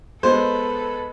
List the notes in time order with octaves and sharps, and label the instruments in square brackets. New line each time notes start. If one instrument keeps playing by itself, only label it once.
[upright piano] G#3 B3 [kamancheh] A4 B4 [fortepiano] C5